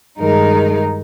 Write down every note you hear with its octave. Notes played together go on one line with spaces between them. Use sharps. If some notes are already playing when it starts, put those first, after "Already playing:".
G2 D#3 G#3 D#4 A#4